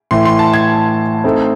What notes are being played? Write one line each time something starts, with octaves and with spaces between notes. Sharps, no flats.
A2 E3 A3 C6
C6
A5
G#6
A3 C4 D#4 A4 C5